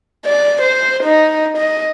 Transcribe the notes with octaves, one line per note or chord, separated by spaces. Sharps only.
D5
C5
D#4
D#5